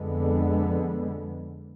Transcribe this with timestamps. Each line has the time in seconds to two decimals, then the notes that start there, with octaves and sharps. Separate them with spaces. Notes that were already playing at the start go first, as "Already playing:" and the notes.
Already playing: F2 D3 G#3 B3